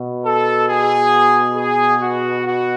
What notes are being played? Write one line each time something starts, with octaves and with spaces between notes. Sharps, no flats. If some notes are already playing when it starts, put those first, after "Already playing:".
Already playing: B2
A4
G#4
G#4
F#4
F#4